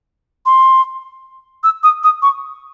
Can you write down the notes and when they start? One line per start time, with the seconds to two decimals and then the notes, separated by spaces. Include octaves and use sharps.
0.46 C6
1.64 E6
1.83 D#6
2.04 D#6
2.22 C#6